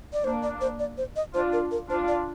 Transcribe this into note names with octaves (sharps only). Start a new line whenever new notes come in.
D5
A#3 D4 C5
D5
C5
D5
C5
D#5
D4 F4 C5
A#4
A#4
D4 F4 C5
D5